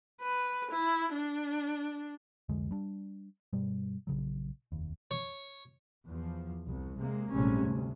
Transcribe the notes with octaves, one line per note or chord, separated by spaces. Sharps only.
B4
E4
D4
C2 F2 D3 G#3
G3 D4
G2 B2 G3
A#1 C#3 F#3
F1 D#2
C#5
E2 F3
C2
C3 G#3 A#3
A#1 G#2 C3 G3 A3 C#4
D2